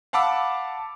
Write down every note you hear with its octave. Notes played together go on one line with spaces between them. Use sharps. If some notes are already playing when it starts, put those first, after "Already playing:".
F5 F#5 A5 B5 D6 E6